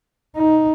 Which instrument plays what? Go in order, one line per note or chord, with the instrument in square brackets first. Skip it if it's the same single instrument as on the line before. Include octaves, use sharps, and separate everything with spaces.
[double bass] D#4